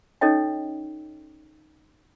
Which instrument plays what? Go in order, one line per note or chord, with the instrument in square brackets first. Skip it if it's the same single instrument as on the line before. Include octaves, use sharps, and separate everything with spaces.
[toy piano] C#4 D#4 A4 C#5 D#5 G5